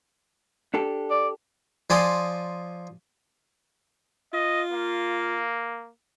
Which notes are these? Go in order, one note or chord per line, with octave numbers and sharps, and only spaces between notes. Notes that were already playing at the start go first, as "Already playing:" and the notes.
D4 G4 A4
D5
F3 D5 G#5 C6 D#6
F4 D#5
A#3